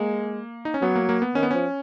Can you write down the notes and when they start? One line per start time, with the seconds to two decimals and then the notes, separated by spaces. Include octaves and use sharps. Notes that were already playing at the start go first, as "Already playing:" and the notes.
Already playing: G#3 A#3
0.65 D#4
0.74 C#4
0.81 F#3 B3
0.96 A#3
1.09 A#3
1.22 B3
1.35 D#3 C#4
1.43 B3
1.51 F3 C#4